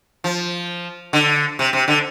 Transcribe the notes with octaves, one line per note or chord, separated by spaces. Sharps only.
F3
D3
C3
C3
D3